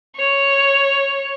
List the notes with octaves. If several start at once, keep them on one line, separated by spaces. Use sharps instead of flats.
C#5